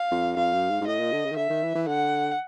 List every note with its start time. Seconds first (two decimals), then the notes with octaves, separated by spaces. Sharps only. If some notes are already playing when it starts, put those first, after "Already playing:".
Already playing: F5
0.11 F2
0.37 F2 F5
0.53 F#2
0.70 G#2
0.81 G#2
0.87 A2 D#5
1.00 A#2
1.12 D3
1.25 C#3
1.32 D#3
1.37 D3 E5
1.50 D#3
1.63 E3
1.75 E3
1.87 D3 F#5